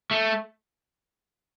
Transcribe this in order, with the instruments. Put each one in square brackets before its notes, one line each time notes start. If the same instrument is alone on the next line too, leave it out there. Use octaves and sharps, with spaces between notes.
[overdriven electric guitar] A3